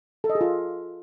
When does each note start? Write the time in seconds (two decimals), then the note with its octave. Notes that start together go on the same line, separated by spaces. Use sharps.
0.24 A4
0.30 D#5
0.35 G#4
0.41 F4